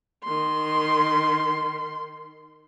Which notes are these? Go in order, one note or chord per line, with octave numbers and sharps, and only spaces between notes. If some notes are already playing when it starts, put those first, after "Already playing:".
D#3 C6